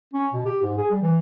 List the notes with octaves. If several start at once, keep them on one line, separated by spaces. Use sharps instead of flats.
C#4
B2
G4
G#2
G#4
G3
E3